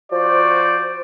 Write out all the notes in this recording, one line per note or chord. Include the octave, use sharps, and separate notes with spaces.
F3 F#4 C5 D5